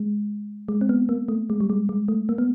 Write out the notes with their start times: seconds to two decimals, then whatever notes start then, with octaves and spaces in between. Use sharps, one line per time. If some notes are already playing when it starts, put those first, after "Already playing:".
Already playing: G#3
0.69 G#3
0.81 C4
0.89 B3
1.09 A#3
1.28 A3
1.50 G#3
1.60 G3
1.70 G#3
1.89 G#3
2.08 A3
2.29 A#3
2.38 B3